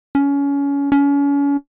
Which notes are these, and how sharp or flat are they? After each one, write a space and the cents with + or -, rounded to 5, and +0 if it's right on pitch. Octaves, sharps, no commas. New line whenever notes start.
C#4 +25
C#4 +35